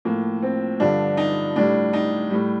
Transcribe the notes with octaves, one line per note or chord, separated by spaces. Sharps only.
A2 F3 A#3
C4
G2 D3 F3 D4
D#4
A2 G3 D4
D#4
A2 G3